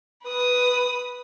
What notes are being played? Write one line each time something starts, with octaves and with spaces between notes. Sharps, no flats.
B4 D#6